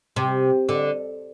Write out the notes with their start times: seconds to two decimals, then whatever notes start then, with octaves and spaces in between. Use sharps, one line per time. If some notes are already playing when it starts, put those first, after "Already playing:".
0.16 C3
0.69 D3